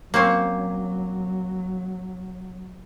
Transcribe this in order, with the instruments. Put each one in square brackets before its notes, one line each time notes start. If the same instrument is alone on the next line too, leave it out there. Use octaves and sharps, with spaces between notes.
[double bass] F#3 [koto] A#3 C4 C#4